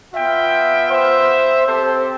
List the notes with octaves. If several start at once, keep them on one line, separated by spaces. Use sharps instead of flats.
B3 F4 E5 G5
C5 E5
C4 G4 A4 C5